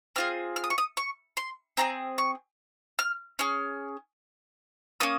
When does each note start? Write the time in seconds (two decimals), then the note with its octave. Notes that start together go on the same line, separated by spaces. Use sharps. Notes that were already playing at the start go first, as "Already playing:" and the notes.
0.16 C4 F4 G#4 F6
0.56 F6
0.64 D#6
0.70 C#6
0.78 D#6
0.97 C#6
1.37 C6
1.77 C4 F4 G#4 A#5
2.18 C#6
2.99 F6
3.39 C#4 G#4 F6
5.00 A#3 C#4 D#6